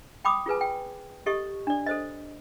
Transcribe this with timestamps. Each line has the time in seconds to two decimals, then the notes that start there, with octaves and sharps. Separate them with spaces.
0.25 G5 B5 D6 D#6
0.46 F4 G#4 B4 G#5
0.61 G5
1.26 G4 A4 D#5 C#6
1.67 D4 D5
1.86 A4 C5 D#5